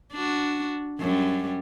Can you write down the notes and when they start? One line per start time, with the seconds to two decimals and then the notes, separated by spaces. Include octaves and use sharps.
0.13 D4 F#4
1.00 F#2 G3